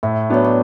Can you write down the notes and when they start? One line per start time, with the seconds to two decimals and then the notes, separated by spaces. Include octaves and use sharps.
0.03 A2 E5
0.30 F#3 B3 D4 C#5
0.45 D5